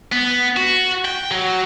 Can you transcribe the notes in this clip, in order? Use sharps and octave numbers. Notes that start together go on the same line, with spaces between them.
B3
F#4
G5
F#3